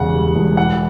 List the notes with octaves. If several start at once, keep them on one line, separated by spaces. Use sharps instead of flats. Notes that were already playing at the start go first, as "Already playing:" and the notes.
Already playing: E1 E2 C#3 G3 F#5
G3
E1
E3 F#5